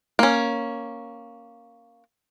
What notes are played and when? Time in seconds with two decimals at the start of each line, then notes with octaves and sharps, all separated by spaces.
0.19 A#3 C#4